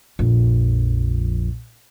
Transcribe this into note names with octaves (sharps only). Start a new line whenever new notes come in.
A#1 F2